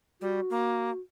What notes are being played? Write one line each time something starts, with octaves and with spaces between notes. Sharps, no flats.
G3 F#4
A#3